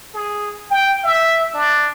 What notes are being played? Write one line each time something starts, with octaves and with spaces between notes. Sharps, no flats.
G#4
G5
E5
D4